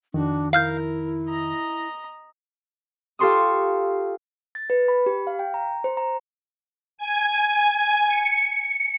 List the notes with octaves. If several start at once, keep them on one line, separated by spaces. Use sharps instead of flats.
F2 D#3 D4 F#4
E4 A#4 F5 F6 G6
D#5 A#5
F4 G4 A4 C6 C#6 D#6
A6
B4
B5
G4
F5
G5
A#5
C5
A#5
G#5
C#7